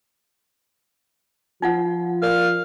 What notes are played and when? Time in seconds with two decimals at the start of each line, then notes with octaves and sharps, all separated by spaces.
1.62 F3 D#4 F4 F#5
2.22 A#4 D5 F5